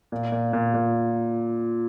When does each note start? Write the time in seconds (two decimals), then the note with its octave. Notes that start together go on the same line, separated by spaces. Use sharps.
0.12 A#2
0.32 A#2
0.53 A#2
0.74 A#2